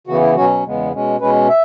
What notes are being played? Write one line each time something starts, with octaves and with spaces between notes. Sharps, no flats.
C#3 E3 B3 F#4
E4
B2 F#3 C#4 F#4
E2 C#3 G#3 B3
B2 G#3 C#4
B2 G#3 C#4 B4
E5